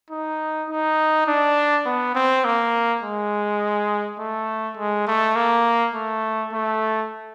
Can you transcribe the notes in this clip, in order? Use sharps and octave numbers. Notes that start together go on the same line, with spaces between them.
D#4
D#4
D4
B3
C4
A#3
G#3
A3
G#3
A3
A#3
A3
A3